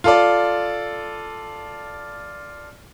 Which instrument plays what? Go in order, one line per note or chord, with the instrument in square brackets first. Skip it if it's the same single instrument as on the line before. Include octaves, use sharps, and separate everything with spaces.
[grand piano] F4 A4 D5